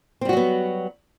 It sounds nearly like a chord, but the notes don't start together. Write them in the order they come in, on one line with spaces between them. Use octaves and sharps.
C4 G3 F#4 F#3 B3